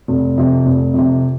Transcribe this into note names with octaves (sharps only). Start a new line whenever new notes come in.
F1
F2 C3
F1
F2 C3